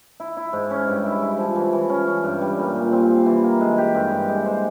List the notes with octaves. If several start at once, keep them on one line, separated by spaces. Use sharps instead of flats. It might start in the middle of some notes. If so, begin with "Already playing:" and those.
E4
E4
G#2
C#4
G2
E4
E4
F3
E3
E3
C#4
C#4
G2
G3
A#2
A#2
C4
C4
E3
A#3
G#3
G4
G2
G2
G#3
C5